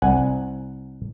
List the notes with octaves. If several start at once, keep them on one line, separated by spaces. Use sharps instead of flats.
C2 F#5 G#5